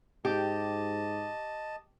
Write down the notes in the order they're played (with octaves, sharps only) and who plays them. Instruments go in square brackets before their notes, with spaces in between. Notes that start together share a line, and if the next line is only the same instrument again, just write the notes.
[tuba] G#2 [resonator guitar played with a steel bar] G4 [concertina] D#5 A5